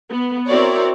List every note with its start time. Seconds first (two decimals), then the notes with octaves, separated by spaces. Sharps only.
0.11 B3
0.47 C4 E4 F#4 A#4 C#5 D5